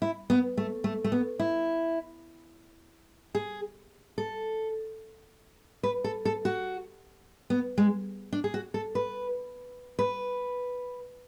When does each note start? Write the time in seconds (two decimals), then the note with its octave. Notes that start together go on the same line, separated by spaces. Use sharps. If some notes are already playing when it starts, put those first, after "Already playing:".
0.02 E4
0.30 B3
0.57 A3
0.84 A3
1.04 A3
1.12 B3
1.39 E4
3.35 G#4
4.18 A4
5.83 B4
6.04 A4
6.25 A4
6.45 F#4
7.50 B3
7.78 G#3
8.32 D4
8.44 G#4
8.54 F#4
8.74 A4
8.95 B4
9.99 B4